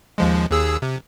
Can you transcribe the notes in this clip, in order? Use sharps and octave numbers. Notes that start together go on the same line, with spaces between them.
D#2 F3 G#3
D#2 G#4 E6
C3